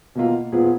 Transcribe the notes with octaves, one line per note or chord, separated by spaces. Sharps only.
B2 A#3 F4
A#2 F3 B3 F4 G#4